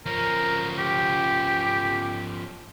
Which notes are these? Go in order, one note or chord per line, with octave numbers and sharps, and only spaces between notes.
F3 C#4 A#4
G4